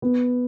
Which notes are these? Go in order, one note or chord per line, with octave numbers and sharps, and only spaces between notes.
B3